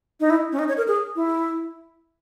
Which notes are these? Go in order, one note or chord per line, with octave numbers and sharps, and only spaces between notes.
D#4
E4
C#4
D#4
C#5
A#4
G#4
E4